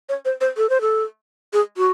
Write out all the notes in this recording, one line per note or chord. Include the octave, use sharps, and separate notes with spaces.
C#5
C5
C5
A4
C5
A4
G#4
F#4